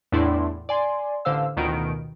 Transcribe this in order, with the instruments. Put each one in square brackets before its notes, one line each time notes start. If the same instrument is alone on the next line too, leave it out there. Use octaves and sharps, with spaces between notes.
[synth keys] E2 A2 D4 E4 D5 C6
D5 G#5 C6
A1 D3 C5 F5 E6
A1 D2 B2 D#3 F4 D7